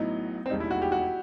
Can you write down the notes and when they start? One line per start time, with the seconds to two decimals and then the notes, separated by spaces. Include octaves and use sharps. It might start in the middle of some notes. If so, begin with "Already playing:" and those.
Already playing: A1 A2 F#3 B3 D#4 E4
0.46 C4
0.50 E1 D#2 D#3 G3 D#4
0.60 E4
0.71 F#4
0.82 G4
0.92 F#4